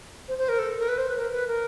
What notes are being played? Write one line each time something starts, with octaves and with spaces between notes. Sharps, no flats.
C5
C5
A#4
A4
A#4
B4
C5
B4
A#4
B4
A#4